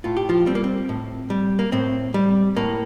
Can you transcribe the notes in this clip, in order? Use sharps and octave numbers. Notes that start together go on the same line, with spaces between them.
A2 F4
G4
F3 F4
G3 C4
A#3
C4
A2
G3
A#3
A2 C4
G3
A2 A#3